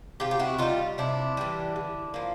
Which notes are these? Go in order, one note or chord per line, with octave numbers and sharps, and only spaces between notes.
C3 F4 G4
G4
E4 F#4
E3 G3 D#4 F4
C3 D4 E4
E3 G3
D3
F3 A#3